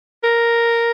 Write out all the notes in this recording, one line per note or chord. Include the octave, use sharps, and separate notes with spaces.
A#4